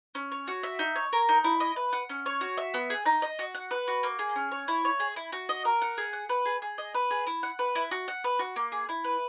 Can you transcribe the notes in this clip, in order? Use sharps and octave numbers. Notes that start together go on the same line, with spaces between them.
C#4
C#5
F#4
E5
D#4
C#5
A#4
D#4
E4
D#5
B4
F#5
C#4
C#5
F#4
E5
B3
G#4
D#4
D#5
F#4
F#5
B4
F#4
A#3
G#4
C#4
C#5
E4
C#5
G#4
E4
F#4
D#5
A#4
F#5
G#4
F#5
B4
G#4
G#4
D#5
B4
G#4
E4
F#5
B4
E4
F#4
F#5
B4
F#4
A#3
G#4
E4
B4